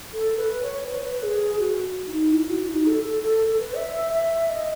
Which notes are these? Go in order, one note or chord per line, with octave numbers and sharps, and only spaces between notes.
A4
B4
C#5
B4
C#5
B4
G#4
F#4
D#4
E4
F#4
D#4
A4
A4
A4
B4
E5
E5
D#5